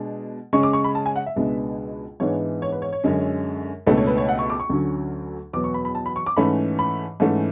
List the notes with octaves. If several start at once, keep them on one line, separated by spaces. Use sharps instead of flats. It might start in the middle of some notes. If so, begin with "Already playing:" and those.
Already playing: B2 G#3 D4
C#3 G#3 C#4 C#6
D6
C#6
B5
A5
G#5
F#5
E5
C#2 B2 G#3 B3 D4
G#2 E3 G#3 B3 D4 C#5
C#5
B4
C#5
C#5
F#2 D3 G#3 C#4
C#2 B2 A3 D4 B4
C#5
B4
C#5
F#5
C#6
D6
C#6
D2 D3 F#3 C#4
E2 B2 F#3 B3 D6
C#6
B5
B5
A5
B5
C#6
D6
G#2 E3 A3 C#4 B5
B5
G#2 E3 A3 C#4